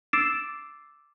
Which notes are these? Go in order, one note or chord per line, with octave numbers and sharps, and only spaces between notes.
D6 E6 A6 C7 D7 E7